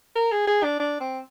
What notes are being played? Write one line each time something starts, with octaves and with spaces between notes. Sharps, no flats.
A#4
G#4
G#4
D4
D4
C4